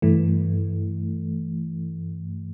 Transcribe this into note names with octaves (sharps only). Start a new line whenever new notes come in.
G2 E3 A3